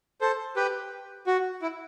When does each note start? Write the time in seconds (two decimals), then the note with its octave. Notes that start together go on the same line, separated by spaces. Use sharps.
0.21 A4 C5
0.56 G4 B4
1.27 F#4
1.62 E4